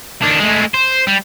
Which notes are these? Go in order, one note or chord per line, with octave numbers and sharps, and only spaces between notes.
D#3 D4
G#3 A3
C5
G3